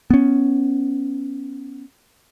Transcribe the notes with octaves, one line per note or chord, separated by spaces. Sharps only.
B3 C#4